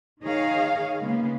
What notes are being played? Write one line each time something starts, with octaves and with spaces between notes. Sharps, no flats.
D#3 D#4 G#4 C#5 F5
C#3 G#3 A#3 B3